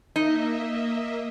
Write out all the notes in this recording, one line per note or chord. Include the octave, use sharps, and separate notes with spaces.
A#3 D#4 D#5 E5